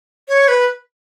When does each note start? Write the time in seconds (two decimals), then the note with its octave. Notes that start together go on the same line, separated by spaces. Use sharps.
0.28 C#5
0.48 B4